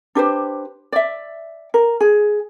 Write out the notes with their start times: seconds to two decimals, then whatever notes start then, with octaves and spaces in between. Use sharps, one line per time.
0.15 D4 G4 B4 C5
0.92 D5 E5
1.74 A#4
2.00 G#4